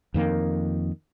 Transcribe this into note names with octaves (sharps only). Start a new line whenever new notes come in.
F2 D#3 A#3